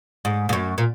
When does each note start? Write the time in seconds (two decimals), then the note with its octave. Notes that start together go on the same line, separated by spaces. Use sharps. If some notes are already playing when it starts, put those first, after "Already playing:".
0.25 G#2
0.49 G#2
0.53 F#2
0.78 A#2